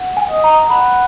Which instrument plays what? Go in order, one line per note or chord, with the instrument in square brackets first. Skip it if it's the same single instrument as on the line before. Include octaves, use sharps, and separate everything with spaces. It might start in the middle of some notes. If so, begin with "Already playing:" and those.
Already playing: [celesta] F#5
G#5
[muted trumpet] D#5
[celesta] A#5
[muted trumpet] F#5 [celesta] B5